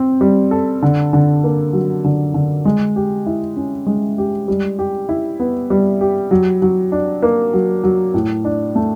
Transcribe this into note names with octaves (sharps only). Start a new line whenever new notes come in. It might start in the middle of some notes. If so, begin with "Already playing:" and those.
Already playing: C4
G3
A4
D3
D3
A#3
F#3
D3
D3
G#3
G4
E4
C#4
G#3
G4
G3
G4
E4
B3
G3
G4
F#3
F#3
D4
A#3
F#3
F#3
A2
D4
A3